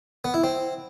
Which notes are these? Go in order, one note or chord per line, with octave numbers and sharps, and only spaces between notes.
B3
E4
C4